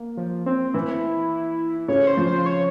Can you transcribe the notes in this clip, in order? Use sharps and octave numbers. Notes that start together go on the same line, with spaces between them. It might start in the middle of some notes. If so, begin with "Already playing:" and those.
Already playing: A#3
F3
C4
E3 E4
C#3 C#5
C5
F3
C5
C#5